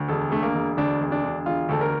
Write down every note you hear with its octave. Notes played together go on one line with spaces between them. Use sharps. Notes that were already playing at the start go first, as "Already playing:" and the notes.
Already playing: D2
E1 A4
D3 A3
A#3
E1
D2 D4
E1
D4
D3
E1 F4
D2 A4
A#4